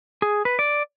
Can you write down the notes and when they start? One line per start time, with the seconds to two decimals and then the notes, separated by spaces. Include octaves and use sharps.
0.22 G#4
0.45 B4
0.59 D5